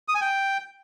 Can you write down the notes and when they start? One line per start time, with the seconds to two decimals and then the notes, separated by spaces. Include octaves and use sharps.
0.08 D#6
0.15 G#5
0.21 G5